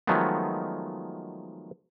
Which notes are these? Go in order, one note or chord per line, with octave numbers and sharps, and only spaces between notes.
D#3 F3 F#3 G#3 A3 B3